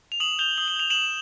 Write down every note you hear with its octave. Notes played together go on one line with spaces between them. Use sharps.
F7
D#6 E7 F#7
G6 F7 G7
D#6 G7
F#7
G6 F7
D#6 E7 F#7